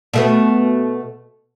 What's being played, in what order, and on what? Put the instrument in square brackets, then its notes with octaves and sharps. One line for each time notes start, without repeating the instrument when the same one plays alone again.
[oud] B2 A3 B3